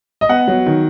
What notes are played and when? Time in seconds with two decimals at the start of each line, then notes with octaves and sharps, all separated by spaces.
0.21 D#5
0.29 B3 F#5
0.48 F#3
0.66 D#3